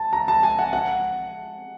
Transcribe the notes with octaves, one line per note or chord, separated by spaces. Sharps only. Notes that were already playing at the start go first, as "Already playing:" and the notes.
Already playing: A5
A#5
A5
G#5
F#5
F#5